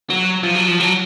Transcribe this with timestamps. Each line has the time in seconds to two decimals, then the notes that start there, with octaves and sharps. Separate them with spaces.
0.10 F#3
0.43 F3
0.55 F#3
0.68 F3
0.80 F#3